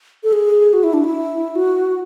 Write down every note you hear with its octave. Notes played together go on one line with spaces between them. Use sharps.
A4
G#4
F#4
E4
D4
E4
F#4